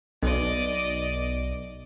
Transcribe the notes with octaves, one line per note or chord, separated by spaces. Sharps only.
B1 D5 D#5